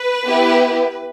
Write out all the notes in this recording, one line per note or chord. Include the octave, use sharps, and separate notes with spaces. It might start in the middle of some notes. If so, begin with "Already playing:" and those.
Already playing: B4
B3 E4 G4